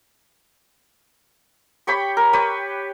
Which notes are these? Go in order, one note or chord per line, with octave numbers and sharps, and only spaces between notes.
G4 C#5 G5 B5
A#4
G4 B4 C#5